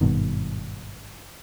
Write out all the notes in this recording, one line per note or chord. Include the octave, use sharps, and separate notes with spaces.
G#1 G2 B2 D#3